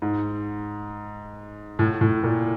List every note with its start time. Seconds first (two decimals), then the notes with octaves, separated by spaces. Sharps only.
0.02 G#2
1.79 A2
2.01 A2
2.24 A#2